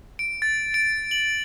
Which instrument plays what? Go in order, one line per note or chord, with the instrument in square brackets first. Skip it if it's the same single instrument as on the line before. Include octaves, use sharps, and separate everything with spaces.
[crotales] D7
A6
D7
F#7